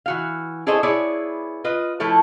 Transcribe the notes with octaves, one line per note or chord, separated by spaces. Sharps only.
E3 F#4 F5
E4 G#4 A4 C5 C#5 D#5
B3 E4 G#4 C#5 D5
F4 B4 D#5
F3 A3 E4 A4 C#5